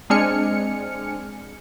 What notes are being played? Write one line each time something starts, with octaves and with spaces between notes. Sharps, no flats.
G#3 C4 D4 G#5 F6 C#7